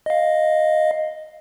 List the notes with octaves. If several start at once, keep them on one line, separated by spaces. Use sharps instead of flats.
D#5 F5